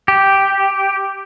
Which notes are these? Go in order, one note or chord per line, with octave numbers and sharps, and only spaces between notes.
G4